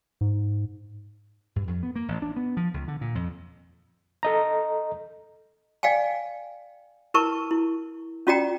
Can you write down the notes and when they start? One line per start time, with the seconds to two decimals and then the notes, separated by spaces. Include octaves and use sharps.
0.21 G#2
1.56 G2
1.68 F2
1.83 B3
1.96 A#3
2.08 A1
2.22 D4
2.36 B3
2.57 F3
2.74 C#2
2.88 D3
3.01 A#2
3.15 F2
4.23 A4 D#5 A#5
5.83 D5 F5 G5 G#5
7.14 E4 A#4 B4 A5 C#6
7.51 E4
8.27 C#4 F4 F#4 D5 G5 A#5